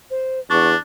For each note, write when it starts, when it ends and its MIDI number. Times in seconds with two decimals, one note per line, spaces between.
0.11 0.40 72
0.50 0.74 40
0.50 0.77 62
0.50 0.69 85